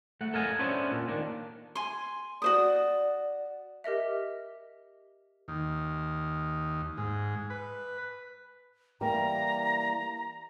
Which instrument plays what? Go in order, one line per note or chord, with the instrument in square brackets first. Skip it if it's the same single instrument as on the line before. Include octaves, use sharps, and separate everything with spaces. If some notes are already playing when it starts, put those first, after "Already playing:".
[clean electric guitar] A3 F#5
A4 A#4 D#5 F5 G#5
B3 C#4 D4 G#4 C5 E5
A#2
D#3 A#3 D4
[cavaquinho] G#5 C6
[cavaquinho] F#4 C5 D#6 [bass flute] D5
[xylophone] G4 A#4 D#5 E5
[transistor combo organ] D#2
G#2
B4
[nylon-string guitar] E3 G3 A#3 [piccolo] A#5